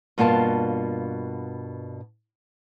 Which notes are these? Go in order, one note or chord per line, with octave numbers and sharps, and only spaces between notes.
G2 B2 A#3 F4 A5